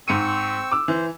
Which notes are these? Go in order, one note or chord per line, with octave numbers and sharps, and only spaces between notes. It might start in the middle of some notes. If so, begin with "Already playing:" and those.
G#2 C4 C#6 E6 C#7 D#7
D6 E6
E3 C5